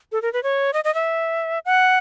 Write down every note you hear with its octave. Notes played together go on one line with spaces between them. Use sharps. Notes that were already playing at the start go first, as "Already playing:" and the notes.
A4
A#4
B4
C#5
D#5
D#5
E5
F#5